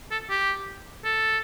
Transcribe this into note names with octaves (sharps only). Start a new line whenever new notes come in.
A4
G4
A4